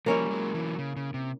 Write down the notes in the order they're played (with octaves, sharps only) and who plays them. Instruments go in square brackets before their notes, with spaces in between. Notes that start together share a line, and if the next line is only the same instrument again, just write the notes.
[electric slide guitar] F3 G3 [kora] A#3 C#4 E4
[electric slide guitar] F#3 G#3
E3 F#3
C#3
C#3
C3